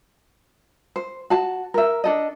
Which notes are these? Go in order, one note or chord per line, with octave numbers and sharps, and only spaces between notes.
C5
F#4 A5
A#4 E5
D4 A4 D#5